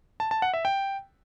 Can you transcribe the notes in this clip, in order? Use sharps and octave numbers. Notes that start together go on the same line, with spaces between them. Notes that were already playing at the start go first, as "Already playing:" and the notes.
A5
A5
F#5
E5
G5